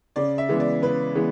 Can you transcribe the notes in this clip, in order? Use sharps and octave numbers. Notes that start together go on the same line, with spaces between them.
C#3 D5
E5
E3 G#3 B3
D5
C#3 B4
E3 G#3 B3